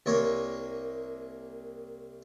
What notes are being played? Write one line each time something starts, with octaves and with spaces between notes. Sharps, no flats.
C2 A#3 C#5